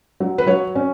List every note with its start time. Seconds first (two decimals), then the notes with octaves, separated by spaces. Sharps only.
0.20 F#3
0.38 B4
0.47 F#3 C#5
0.75 C#4